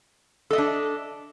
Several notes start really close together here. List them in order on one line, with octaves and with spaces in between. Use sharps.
A4 D#5 E5 D4